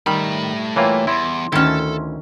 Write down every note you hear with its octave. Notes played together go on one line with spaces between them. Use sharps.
D#3 G3 A3 B5
E3 A#3 F4 C#5 G5
E2 E4 C6
D2 D#3 C#4 E4 A4